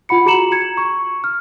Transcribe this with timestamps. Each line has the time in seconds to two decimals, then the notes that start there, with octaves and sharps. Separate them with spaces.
0.09 F4 F#5 B5 C#7
0.26 F#4 G#4 A#5 C#7 E7 F#7
0.52 G#6 C#7
0.77 C#6
1.24 F6